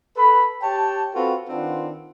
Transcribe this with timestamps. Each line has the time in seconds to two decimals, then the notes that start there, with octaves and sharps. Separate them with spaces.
0.17 A4 B4 B5
0.63 G4 C#5 G5 A5
1.15 C4 F4 F#4 A4 B4 F5
1.49 D#3 C4 D4 F4 B4 F#5